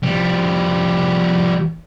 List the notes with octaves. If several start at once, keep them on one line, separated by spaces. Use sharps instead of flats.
F3 G3